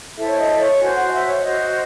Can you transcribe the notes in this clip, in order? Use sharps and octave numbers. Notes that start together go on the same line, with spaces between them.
E4 A4 C5 E5
C#5
D#5
C#5
F#4 C5 G#5
F#5
D#5
E5
C#5
E5
F#4 C5 D#5